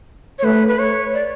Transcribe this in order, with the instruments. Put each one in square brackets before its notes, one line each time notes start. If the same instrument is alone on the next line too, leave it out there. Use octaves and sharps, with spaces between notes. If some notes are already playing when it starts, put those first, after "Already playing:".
[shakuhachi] C#5
[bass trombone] A3 [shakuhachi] B4
[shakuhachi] B4
C#5
D5